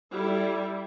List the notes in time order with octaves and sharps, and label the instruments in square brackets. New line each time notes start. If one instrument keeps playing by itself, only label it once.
[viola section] G3 E4 A4